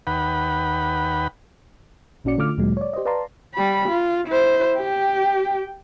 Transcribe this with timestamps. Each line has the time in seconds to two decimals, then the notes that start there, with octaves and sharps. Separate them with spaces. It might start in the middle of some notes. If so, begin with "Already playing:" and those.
0.07 D#2 B4 F#5 G5 B5
2.24 A1 A#2 C#4 F#4 D5 C#7
2.38 D3 A3 F4 D6 F6
2.58 D2 A#2 D3 F#3 G#3
2.77 C#5 D5
2.93 G4 C5 D5 D#5
3.05 B4 D5 F5 A5 A#5 C6
3.54 G3 B5
3.89 F4
4.28 E4 C5
4.78 G4 G5